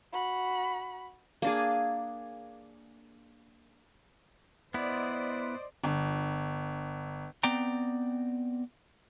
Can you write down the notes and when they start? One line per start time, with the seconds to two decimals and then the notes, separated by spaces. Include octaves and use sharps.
0.13 F#4 B5
1.42 A#3 D4 G#4
4.74 B3 E4 C5 D5 D#5
5.84 G1
7.43 B3 C4 D5 G5 A#5